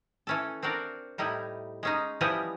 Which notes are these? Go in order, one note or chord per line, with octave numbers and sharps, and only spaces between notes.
E3 C#4 A4
C4 D4 F#4 A#4 D5
A2 G3 D#4 E4
G#3 C#4 D#4
E3 F3 G3 B3 E4 D#5